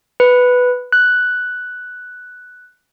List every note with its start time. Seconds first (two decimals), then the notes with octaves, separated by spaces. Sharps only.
0.20 B4
0.92 F#6